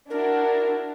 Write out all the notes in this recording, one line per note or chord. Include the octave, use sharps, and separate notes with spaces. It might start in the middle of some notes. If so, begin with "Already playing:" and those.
D4 E4 F#4 A#4